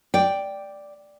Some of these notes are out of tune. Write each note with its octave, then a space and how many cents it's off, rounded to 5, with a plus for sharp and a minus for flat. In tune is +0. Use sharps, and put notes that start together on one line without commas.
D5 +0 G5 +0